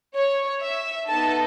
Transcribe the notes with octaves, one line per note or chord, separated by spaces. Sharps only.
C#5
E5
B3 D#4 A4 A5